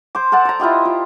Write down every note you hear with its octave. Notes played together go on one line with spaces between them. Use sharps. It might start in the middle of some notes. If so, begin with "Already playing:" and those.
C5 D6
A4 D5 F#5 A5
D5 A#5
E4 F4 G4 D#5
F4